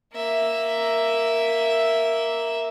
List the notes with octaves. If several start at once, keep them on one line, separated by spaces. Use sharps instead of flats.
A#3 E5